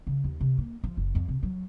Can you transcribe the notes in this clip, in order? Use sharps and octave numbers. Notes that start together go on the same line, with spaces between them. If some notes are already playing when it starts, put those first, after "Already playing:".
C#3
D#2
C3
A#3
F3
F#1
F2
C3
F#3